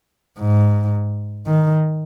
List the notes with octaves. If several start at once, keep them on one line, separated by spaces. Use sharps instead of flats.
G#2
D#3